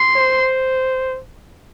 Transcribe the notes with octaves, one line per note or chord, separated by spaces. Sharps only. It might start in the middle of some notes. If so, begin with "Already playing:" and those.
Already playing: C6
C5